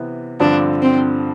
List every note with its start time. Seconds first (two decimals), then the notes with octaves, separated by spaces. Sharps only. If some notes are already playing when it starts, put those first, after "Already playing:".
Already playing: C3 E3 B3
0.40 G2 D3 F3 C4 D4
0.82 C4